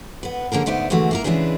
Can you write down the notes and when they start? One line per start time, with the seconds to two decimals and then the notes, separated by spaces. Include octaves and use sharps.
0.23 B3 B4
0.52 F#2 D3 A#3 G#4 A#4
0.66 D2 G#2 B3 D#4 D5 E5
0.90 D3 E3 G#3 A3 E4 F#4
1.11 A#3 E4 A#4
1.24 C#3 E3 G#3 D4 G#4 B4